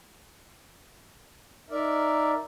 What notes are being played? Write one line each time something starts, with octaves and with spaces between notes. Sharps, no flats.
D#4 A#4 D5 E5